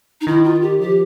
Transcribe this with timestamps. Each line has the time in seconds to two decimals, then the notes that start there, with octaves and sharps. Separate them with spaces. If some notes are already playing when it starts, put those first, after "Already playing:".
0.21 D#4
0.27 D#3 E4
0.45 F4
0.62 G4
0.80 F3 G4